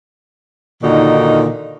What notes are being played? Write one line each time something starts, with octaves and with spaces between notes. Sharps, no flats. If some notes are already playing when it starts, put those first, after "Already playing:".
A#2 D3 D#3 D#4 F#4